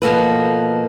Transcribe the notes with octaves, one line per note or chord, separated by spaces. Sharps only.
B2 D3 F3 A#3 A4 B4